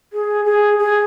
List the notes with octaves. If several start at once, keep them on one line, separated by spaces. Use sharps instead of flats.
G#4
G#4
G#4